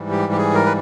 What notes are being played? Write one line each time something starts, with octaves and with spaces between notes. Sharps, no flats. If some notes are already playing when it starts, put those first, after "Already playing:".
Already playing: G#2 E3 G3
G4
G4
G#4
A#4
B4